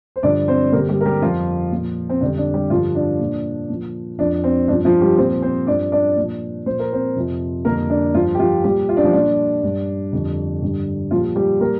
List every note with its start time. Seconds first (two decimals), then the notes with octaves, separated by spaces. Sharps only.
0.16 C5
0.23 G2 D3 F3 D4 D5
0.48 C4 C5
0.72 G2 D3 G3 A#3 A#4
0.89 G3 G4
1.01 A#4
1.06 G3 G4
1.22 F2 F3 F4
1.72 A#2 F3
2.10 C4
2.21 F2 D3 G3 D4
2.38 D4
2.54 G3 G4
2.70 G2 D3 F3 G3 F4
2.95 D4
3.20 A#2 F3
3.69 A#2 F3
4.19 F2 F3 D4
4.44 C4
4.68 G2 D4
4.72 F3
4.85 F3 F4
5.01 G3 G4
5.18 A#2 F3 C4 C5
5.42 C4 C5
5.67 G2 F3 D4 D5
5.92 D4 D5
6.17 A#2 F3
6.66 A#2 F3 C5
6.79 A#4
6.93 C4 C5
7.16 F2 C3 F3
7.65 F2 D3 G3 A#3 A#4
7.90 D4
8.14 G2 F3 F4
8.35 G4
8.39 F3 F4
8.64 A#2 G3 G4
8.67 F3
8.89 F4
8.97 D4
9.04 F3 F4
9.13 A#2 G3 D4
9.63 G2 G3
10.12 F2 D3 G3
10.62 G2 D3 G3
11.11 A#2 F3 G3 F4
11.36 G3 G4
11.61 A#2 G3 A#3 A#4